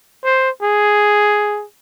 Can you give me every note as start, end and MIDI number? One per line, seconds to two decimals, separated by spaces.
0.24 0.50 72
0.63 1.65 68